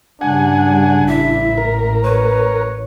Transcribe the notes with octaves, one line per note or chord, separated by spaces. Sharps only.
G2 C#3 G3 D4 F#5 G#5
A1 E4 E5
A#4
B4 C#5